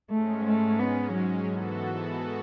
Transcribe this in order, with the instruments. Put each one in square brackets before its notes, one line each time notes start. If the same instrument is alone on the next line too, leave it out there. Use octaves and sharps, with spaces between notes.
[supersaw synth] G#2 G#3 C#4 [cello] A3
[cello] A3
B3
F#3
[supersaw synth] G#2 E3 B3 F#4 A4